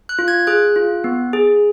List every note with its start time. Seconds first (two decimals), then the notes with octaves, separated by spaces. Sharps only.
0.09 F#6
0.19 F4
0.28 G#6
0.47 G#4 F#6
0.76 F4
1.04 B3
1.33 G#4